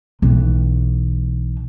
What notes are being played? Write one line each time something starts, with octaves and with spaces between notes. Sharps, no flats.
B1 E3